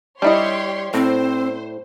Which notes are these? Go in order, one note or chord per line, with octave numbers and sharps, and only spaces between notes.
G3 D4 E4 G4 C#5 D#5 C6
A2 C4 C5